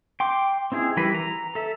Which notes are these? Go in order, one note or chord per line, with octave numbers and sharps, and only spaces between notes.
G5 C6 D6
C4 D#4 E4 G#4
E3 G3 A#4 B4
A#5
A4 E5